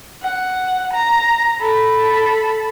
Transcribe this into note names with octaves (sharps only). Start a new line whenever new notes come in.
F#5
A#5
A4 B5